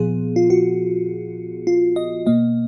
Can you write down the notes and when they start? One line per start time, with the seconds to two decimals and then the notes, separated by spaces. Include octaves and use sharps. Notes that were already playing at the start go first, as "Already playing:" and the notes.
Already playing: A#2 F3 B3 G#4
0.36 F4
0.50 F#4
1.67 F4
1.96 D#5
2.26 B2 A#3 D#5